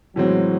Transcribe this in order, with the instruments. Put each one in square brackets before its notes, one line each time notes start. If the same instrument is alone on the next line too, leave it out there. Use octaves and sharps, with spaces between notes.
[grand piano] A2 E3 G#3 C4 [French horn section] F#3